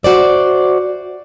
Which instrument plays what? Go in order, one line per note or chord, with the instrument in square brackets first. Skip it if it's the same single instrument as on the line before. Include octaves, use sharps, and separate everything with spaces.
[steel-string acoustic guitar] F#4 C5 D5 E5